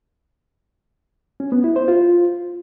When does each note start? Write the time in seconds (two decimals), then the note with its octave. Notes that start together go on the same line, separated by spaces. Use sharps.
1.40 C#4
1.52 B3
1.64 E4
1.76 C5
1.88 F4